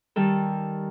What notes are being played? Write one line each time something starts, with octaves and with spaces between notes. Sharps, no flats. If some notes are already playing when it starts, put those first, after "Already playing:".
D#3 G3 A4